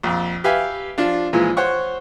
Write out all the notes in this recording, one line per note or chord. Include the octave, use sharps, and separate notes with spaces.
A#1 F2
G4 B4 E5 F5 G#5
F3 D4 F4
A#2 E3 F3 G#3
C5 C#5 F#5 C#6